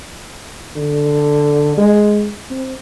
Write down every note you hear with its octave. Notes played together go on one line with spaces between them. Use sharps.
D3
G#3
C4